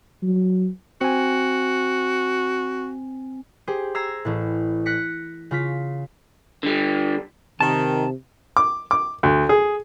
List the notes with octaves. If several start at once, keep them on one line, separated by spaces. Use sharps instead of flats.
F#3
C4 F#4 G#5
G4 G#4 C5
A#5 E6 G#6 A#6 C7
A1 A2
F#6 A#6 B6 C#7
C#3 F4 B6
D3 G3
C3 D#3 A5
D6
D6
D2
G#4